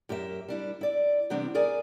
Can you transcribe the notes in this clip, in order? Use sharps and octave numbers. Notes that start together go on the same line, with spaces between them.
F#2 G4 A#4 E5
G3 D4 E4
E4 D5
C3 E3 G3 B3 C4 D4
G#4 A#4 D5 G#5